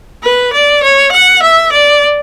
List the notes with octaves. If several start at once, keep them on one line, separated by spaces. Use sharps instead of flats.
B4
D5
C#5
F#5
E5
D5